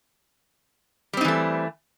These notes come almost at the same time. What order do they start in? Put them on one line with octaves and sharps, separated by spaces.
G3 C4 D#4 E3 A3